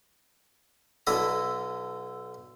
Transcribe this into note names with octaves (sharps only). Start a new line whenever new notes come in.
B1 D3 E4 A4 A#5 D#6